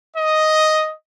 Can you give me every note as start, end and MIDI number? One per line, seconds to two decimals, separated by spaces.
0.17 0.92 75